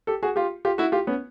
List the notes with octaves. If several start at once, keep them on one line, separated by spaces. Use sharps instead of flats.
G4 A4
F#4 G#4
F4 G4
F4 G4
E4 F#4
F4 G4
B3 C#4